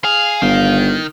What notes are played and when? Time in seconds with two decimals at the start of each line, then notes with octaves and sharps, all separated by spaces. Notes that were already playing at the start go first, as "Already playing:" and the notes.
0.04 G#4 F5
0.42 G1 D#3